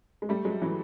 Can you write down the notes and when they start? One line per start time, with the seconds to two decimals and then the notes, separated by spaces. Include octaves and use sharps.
0.22 G#3
0.29 G3 A3
0.45 F#3 G#3
0.62 E3 F#3